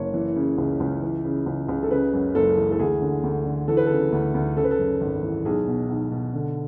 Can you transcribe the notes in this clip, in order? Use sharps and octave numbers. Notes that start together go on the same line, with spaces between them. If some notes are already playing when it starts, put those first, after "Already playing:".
Already playing: F#1 C#5
E3
C#3
C#2
C#2
E3
C#3
C#2
C#2
A4
C#3 B4
F#2
F#1 A4
E3
A4
D2 G#4
D3
D2
D3
E3 A4
B4
C#3 A4
D2
D2
C#3 A4
B4
A4
F#2
G#1
E3
B1 G#4
B2
B1
B2
D3